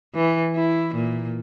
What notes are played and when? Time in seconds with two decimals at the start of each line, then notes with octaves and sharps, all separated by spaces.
0.15 E3
0.55 E4
0.95 A#2